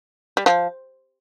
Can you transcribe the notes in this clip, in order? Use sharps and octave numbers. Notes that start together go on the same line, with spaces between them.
G3
F3